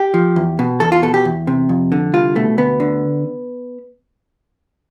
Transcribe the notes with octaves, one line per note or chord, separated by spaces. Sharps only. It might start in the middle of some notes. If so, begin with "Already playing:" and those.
Already playing: G4
F3
E2
B2
E2 A4
F4
B2 A4
G4
E2
C3
F2
D3
C2 F4
B2 A3
D2 B3
D3